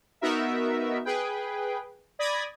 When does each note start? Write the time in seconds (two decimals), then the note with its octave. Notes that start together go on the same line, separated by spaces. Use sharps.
0.21 B3 D#4 F#4 A#4 E5
1.05 G#4 B4 G5
2.19 D5 B5 D#6 G#6 A#6